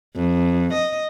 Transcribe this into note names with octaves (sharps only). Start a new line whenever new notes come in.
F2
D#5